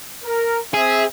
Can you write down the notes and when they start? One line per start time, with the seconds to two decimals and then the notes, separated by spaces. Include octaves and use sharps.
0.24 A#4
0.74 C4 G#4 E5